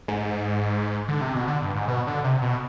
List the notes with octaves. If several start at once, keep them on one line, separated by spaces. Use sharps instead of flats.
G#2
D3
C3
B2
D3
G2
G#2
B2
D3
C3
B2